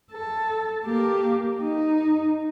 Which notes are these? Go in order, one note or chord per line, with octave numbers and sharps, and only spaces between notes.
A4
A#3 G4
D#4